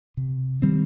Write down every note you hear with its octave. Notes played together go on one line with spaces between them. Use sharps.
C3
D#3 G3 C4